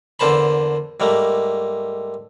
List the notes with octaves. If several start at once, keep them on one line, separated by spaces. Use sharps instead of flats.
E2 D3 A#3 C5 A5 B5
G#2 G3 A3 A#3